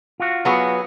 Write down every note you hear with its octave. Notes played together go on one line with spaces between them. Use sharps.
F4 F#4
F#3 B3 G#4